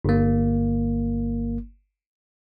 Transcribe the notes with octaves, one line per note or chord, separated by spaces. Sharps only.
G1 A#3